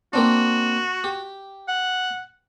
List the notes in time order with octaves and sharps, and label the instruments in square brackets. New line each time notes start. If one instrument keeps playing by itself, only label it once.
[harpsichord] A#3 C4 D4 [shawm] F#4
[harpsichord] G4
[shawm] F#5